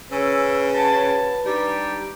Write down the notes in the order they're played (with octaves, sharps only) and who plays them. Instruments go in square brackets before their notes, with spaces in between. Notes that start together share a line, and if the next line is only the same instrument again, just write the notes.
[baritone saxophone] C#3 [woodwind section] C#4 E6 [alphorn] B4
[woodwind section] F#4 C#5 A5
[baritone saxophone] G3 [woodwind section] D4 D#4 G4